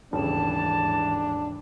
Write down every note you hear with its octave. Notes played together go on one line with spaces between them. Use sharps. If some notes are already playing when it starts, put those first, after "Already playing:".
D#1 G#2 C#3 E3 D4 A5